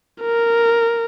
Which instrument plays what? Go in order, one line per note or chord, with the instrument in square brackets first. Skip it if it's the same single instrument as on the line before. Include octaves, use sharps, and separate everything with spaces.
[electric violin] A#4